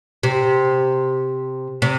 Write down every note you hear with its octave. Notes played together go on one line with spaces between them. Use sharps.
C3
C3